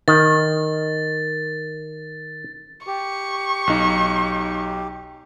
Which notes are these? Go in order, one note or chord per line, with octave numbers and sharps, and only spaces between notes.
D#3 A6
G4 C#6
B1 D#4